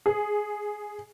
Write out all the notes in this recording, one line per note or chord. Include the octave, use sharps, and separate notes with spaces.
G#4